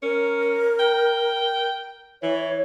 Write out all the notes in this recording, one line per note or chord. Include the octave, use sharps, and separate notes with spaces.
C#4 A#4
G5
E3 C#5